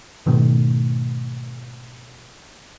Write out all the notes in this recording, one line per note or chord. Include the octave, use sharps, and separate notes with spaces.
G#2 B2 D#3 A3